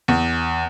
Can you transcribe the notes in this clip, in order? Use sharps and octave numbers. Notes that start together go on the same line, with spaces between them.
E2